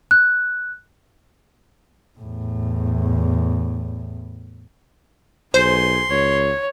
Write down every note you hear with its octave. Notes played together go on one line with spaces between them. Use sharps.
F#6
E2 A2
B1 G#4 C5 C6
C#2 C#5